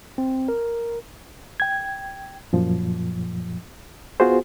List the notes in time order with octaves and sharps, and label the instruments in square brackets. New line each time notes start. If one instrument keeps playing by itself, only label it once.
[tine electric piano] C4
A#4
[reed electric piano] G5 G#6
F#2 A#2 F3
B3 F4 F#4 G#4 C5